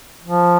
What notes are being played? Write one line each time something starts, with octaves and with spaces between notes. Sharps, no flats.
F3